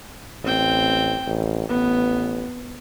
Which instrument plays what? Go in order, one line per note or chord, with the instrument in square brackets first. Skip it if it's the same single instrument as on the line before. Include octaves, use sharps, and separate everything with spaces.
[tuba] A1 [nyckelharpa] C4 G5
[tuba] A1
[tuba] A1 [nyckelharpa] B3